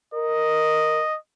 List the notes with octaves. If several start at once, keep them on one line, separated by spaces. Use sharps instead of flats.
A#4 D#5